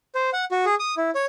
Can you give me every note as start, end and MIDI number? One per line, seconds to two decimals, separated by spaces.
0.15 0.30 72
0.33 0.45 78
0.51 0.65 66
0.65 0.75 68
0.79 0.95 87
0.97 1.10 64
1.15 1.26 73